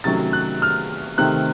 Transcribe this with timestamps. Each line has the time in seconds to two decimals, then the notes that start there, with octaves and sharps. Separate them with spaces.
0.04 C3 D#3 F#3 A3 C#4 A6
0.33 F#6
0.62 F6
1.18 C3 D#3 A3 C4 F#6